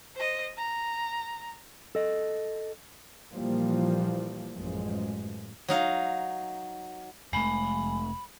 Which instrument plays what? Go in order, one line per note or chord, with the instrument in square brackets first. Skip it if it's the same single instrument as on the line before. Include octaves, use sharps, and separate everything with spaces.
[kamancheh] C5 D#5
A#5
[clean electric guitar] A4 D#5
[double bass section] A#2 E3 F3 G3 A#3
A1 F#2 F3 G#3
[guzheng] F#3 D#4 F5
[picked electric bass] F1 A3 [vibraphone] G#3 [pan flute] B5